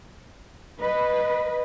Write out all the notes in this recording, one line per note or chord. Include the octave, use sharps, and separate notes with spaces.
B4 D#5